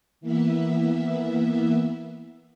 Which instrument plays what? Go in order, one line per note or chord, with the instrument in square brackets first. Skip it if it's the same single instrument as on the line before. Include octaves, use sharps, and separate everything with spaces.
[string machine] E3 A#3 B3 E5